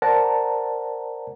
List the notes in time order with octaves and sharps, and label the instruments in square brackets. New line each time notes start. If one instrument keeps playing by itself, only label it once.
[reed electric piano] A#4 C5 D5 F#5 A5 A#5